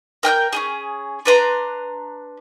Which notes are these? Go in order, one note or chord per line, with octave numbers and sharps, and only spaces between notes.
A#4 G5 F6 G6
C#4 D#4 G#4
D4 B4 A#5 C6